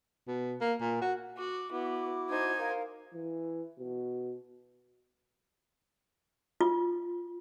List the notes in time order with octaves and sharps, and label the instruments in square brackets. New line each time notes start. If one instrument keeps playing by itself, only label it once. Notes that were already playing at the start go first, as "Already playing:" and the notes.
[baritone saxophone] B2
A#3
A#2
F#4
[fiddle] F#4 [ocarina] D6
[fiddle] B3 [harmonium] E4 F#4
[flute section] D#4 G#6 [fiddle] C5 G#5
[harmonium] A#4 [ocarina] F5
[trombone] E3
B2
[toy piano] F4